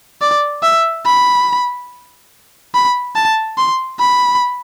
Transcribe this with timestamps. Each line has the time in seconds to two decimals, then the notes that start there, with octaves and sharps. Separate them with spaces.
0.21 D5
0.63 E5
1.06 B5
2.75 B5
3.15 A5
3.58 C6
4.00 B5